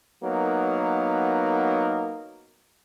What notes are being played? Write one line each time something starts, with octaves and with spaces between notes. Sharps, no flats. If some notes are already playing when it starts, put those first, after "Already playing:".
F#3 A#3 B3 D#4 A#4